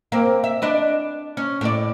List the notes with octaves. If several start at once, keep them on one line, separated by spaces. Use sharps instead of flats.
A#3 C4
E5
D4 B4 D#5
C#4
A2 D5